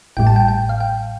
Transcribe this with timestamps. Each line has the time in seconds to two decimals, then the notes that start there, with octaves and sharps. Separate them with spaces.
0.17 A1 A2 G3 G5
0.27 A5
0.36 G5
0.48 G5
0.69 F5
0.80 G5